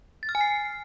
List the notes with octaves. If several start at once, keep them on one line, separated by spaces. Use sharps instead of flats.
A6
F6
G#5
C7